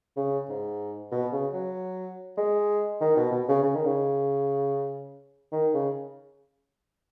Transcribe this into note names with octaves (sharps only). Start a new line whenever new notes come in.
C#3
G#2
B2
C#3
F#3
G#3
D#3
B2
B2
C#3
C#3
D#3
C#3
D#3
C#3